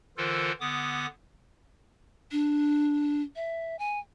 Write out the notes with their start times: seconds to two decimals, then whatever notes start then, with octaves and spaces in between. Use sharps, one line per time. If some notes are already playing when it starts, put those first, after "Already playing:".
0.17 D3 E3 F4 A4 A#4 C5
0.60 D3 B3 D6 D#6
2.32 D4
3.36 E5
3.79 G#5